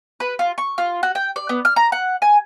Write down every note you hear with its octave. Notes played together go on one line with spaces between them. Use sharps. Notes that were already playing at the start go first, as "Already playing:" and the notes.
B4
F4
C#6
F4
F#4
G5
D5
B3
F6
A#5
F#5
G#5